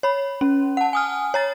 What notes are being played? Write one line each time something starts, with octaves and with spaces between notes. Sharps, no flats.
C#5 B5
C#4
F#5 A5
G#5 D#6 F6
C#5 A#5 A6